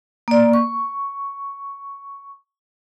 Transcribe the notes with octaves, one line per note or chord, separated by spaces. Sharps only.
A#3 D5
C#6